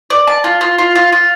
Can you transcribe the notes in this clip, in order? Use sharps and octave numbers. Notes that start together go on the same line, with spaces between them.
D5
A5
F4
F4
F4
F4
F4